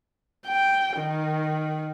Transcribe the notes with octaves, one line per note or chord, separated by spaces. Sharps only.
G5
D#3